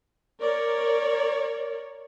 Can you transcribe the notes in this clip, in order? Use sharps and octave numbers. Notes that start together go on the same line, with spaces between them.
A#4 C#5 D5